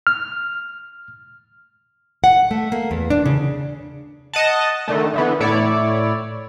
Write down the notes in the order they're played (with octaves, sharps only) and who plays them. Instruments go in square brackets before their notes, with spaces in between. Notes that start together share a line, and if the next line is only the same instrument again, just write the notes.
[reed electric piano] F6
[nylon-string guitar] F#5
A3
A#3
E2
D4
C#3
[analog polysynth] D#5 F#5 A5
D3 D#3 A3
D3 E3 B3
A2 E4 C#5 D5